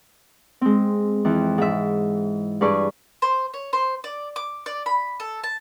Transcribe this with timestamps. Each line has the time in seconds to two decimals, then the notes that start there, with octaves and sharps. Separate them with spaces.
0.61 G#3 C4
1.25 F2 E3
1.58 G#2 E5
2.61 G2 G#4 B4 D5 C#6
3.22 C5
3.54 C#5
3.73 C5
4.04 D5
4.36 D6
4.66 D5
4.86 B5
5.20 A4
5.44 A5